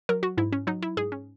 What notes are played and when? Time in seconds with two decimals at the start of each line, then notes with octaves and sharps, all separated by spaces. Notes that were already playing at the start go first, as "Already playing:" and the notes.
0.09 F#3 A#4
0.23 F#4
0.38 G#2 E4
0.53 C#4
0.67 F#3 D#4
0.83 E4
0.97 G#2 G#4
1.12 C#4